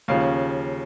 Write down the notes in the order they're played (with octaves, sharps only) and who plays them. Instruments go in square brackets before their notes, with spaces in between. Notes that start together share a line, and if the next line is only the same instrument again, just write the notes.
[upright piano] D#2 C#3 F3 F5